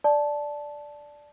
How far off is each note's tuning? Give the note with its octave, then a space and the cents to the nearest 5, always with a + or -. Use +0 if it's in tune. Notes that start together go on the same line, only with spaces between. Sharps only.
D5 +0 A5 -10